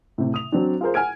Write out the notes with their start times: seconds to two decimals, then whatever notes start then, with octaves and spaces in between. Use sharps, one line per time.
0.18 A2 C3
0.34 D#6 F7
0.52 F#3 C4 D4
0.81 F4 G#4 A#4 C5
0.94 F#5 G#5 F6 G#6 D7